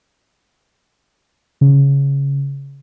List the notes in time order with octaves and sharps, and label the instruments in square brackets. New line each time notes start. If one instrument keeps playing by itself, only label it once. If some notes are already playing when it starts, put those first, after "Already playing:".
[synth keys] C#3